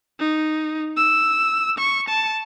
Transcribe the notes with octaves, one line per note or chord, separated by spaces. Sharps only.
D#4
E6
C#6
A5